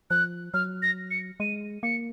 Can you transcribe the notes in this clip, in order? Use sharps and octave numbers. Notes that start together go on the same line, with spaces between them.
F3 F#6
F#3 F6
A#6
C#7
G#3 D#7
A#3 C#7